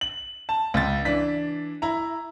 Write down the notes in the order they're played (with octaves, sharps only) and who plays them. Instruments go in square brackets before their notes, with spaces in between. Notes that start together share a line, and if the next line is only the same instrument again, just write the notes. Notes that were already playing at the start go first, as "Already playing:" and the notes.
[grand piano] F#7
A5
C#2 A6
E3 D4 B6
E4 A#5